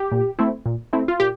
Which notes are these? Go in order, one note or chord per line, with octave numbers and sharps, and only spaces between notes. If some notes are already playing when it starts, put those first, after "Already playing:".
Already playing: G4
A#2
A3 C4 E4
A#2
A3 C4 E4
F4
A#2 G4